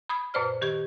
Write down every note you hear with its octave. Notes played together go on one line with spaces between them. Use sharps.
B5 D#6 G#6
F#2 A#2 B4 C5 D5 F6
D#3 G4 C#6 G#6